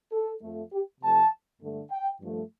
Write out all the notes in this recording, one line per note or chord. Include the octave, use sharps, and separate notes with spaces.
A4
F2 F3 A3
G4
C3 F3 A3 A5
G2 D3 A3
G5
G2 F3 A3